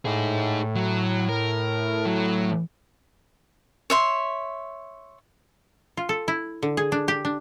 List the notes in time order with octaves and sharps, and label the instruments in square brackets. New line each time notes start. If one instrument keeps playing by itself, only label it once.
[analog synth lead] A2 [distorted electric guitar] D#4 G#4
[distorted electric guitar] F#3
A#4
F#3
[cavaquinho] C#5 E5 C6
[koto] F4
A4
E4
D3
G#4
D4
G4
D4